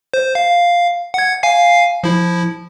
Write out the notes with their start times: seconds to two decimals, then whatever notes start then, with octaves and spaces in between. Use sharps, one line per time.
0.14 C5
0.35 F5
1.14 F#5 G#6
1.43 F5 G#5 C7
2.04 F3 E4